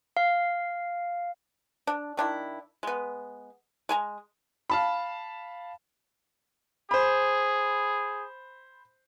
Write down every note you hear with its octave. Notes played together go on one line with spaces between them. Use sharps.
F5
D4
D#3 D4 E4
G#3 B3
G#3 G#5 A#5
F5 A5 B5
G#4 C5 B5